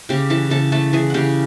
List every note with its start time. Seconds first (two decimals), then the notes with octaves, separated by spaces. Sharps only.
0.09 C#3 G4 G5
0.30 E3 A4 A5
0.50 C#3 A4 A5
0.72 A3 A4 A5
0.93 E3 G#4 G#5
1.10 C#3 G4 F#5 G5